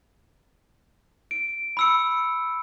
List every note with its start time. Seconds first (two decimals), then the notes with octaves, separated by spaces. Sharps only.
1.31 D7
1.77 B5 E6 C#7